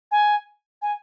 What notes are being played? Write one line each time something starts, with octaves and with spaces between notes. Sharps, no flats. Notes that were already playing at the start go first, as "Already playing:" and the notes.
G#5
G#5